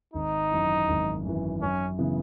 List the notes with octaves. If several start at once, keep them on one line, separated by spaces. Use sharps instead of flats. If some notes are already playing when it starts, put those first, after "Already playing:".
G#1 D#4
F#2 E3
G#1
F#2 E3
F#2 C#4
C#3 E3 B3